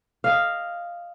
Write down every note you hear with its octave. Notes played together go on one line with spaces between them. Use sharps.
D#5 F5